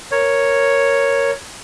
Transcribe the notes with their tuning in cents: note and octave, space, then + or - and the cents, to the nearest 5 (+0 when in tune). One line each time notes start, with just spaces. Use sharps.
A#4 +0 C#5 +0